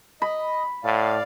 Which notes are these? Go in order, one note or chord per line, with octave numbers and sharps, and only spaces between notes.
D#5 B5
A2 D5 F5